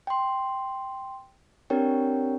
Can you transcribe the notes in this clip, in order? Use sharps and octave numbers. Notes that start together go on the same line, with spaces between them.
G5 C6
C4 D4 G4 A#4 C#5 G5